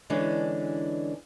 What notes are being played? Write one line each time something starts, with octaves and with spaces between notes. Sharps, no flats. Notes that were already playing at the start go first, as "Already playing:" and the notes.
D3 E3 G#3 C#4 D4